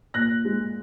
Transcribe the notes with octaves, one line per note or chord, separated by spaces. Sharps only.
A#2 F#6 A#6
G#3